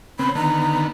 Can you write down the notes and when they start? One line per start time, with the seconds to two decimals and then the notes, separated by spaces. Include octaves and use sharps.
0.19 C#3 B3 C4 B5
0.35 D3 D#3 B3 A#5